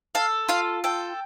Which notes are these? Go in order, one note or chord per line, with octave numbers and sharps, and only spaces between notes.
A4 F5
F4 F5
A4 G5